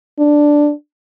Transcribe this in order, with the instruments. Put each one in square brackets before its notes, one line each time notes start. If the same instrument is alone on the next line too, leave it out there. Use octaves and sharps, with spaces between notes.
[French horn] D4